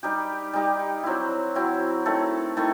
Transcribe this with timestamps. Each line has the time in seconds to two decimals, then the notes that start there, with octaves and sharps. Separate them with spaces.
0.03 G3 D#4 G4
0.53 G3 D#4 G4
1.04 F#3 C4 E4
1.55 F#3 C4 E4
2.06 D#3 A3 E4 A4
2.57 D#3 A3 E4 A4